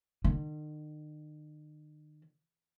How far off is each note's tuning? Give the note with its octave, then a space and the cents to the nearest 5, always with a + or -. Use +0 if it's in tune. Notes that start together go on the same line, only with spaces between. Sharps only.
D#3 -40